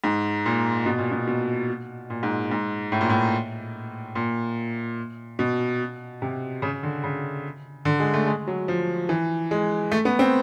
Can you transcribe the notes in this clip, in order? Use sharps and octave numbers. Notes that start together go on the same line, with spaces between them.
G#2
A#2
B2
A#2
B2
B2
A#2
G#2
G#2
A2
A#2
A2
A#2
B2
C3
C#3
D3
C#3
D3
G#3
A3
G#3
F#3
F3
E3
G#3
A3
B3
C4